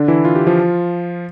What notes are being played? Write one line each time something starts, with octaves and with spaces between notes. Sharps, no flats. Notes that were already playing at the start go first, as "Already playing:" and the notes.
Already playing: D3 D4
E3 E4
F4
G4
F3 F4